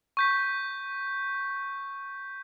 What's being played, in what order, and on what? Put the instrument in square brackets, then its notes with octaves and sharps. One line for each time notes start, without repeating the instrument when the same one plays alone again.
[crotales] C#6 G6 B6